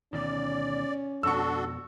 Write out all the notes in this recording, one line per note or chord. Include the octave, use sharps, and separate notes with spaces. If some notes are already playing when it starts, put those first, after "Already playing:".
D2 B2 D#3 C#4 D5
F2 B2 D4 F#4 A4 C#6 E6